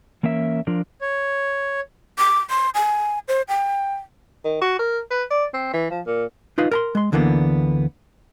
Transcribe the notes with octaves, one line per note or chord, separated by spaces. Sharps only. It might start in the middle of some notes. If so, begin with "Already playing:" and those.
E3 A#3 C#4 A#4 E5
F3 D4 F4 A#4
C#5
D6
C6
G#5
C5
G5
D#3
F#4
A#4
B4
D5
C4
E3
F3
A#2
D#4 F4 B4 D#5 F5
A#4 A#5 C6
G#3 C6
D2 D3 E3 A#3 B3